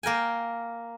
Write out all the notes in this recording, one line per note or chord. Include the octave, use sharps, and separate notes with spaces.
A#3 A#4 G5 G#5